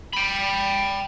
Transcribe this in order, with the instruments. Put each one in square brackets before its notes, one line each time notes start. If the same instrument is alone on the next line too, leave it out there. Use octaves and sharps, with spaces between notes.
[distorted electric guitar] G5 B5